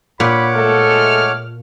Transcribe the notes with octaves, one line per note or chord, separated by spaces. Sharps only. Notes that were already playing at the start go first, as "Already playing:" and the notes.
A#2 C#5 F#5 B5 D6
G#3 A3 A4 F6